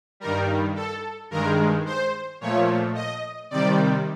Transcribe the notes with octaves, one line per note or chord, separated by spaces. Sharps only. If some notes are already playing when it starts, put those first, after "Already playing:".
G2 D#3 G3 A#4
A4
G2 D#3 G#3 A#4
C5
A#2 F3 A3 C#5
D#5
C3 D#3 G3 D5